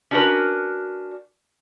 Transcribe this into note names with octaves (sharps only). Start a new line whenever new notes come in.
C#4 D4 F#4 G4 A#4 B4